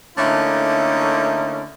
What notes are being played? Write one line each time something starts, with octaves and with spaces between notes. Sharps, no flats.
D3 A3 A#3 C#4 D#4 E4